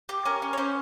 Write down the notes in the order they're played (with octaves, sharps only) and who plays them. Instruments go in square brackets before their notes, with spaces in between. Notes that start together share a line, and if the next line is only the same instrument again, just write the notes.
[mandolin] G4
C#4 A#4
C#4
C#5
C#4 C5